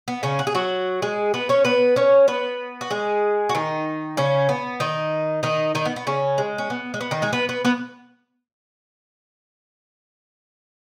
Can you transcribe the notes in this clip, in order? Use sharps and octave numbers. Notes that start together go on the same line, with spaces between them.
B3
C#3 C#4
F#4
G#4
F#3 F#4
G#3 G#4
B3 B4
C#4 C#5
B3 B4
C#4 C#5
B3 B4
F#4
G#3 G#4
F#4
D#3 D#4
C#3 C#4
B3
D#3 D#4
D#3 D#4
D#3 D#4
B3
B3
C#3 C#4
G#3
C#4
B3
G#3
B3
D#3 D#4
G#3 G#4
B3 B4
B3 B4
B3 B4